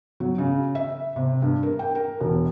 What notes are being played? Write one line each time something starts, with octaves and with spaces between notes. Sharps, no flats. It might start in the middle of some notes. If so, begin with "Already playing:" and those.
F#3
C#3
E5
C3
G2
A#4
G5
A#4
E1